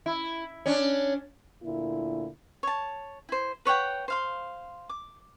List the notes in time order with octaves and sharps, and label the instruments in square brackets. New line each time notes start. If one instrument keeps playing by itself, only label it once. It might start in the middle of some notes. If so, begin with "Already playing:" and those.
[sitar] E4
C#4 D4
[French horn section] D2 A#2 D3 A#3 E4
[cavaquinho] C#5 A5
E4 C5
B4 C#5 F#5 G5
C5 F5 C6
D6